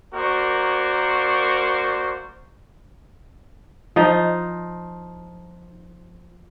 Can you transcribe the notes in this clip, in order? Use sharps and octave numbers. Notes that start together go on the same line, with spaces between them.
A#3 F#4 A#4 C5 D5 C#6
F3 D#4